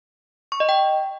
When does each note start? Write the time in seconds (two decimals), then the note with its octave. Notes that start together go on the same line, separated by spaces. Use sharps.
0.52 C#6
0.60 D#5
0.69 G5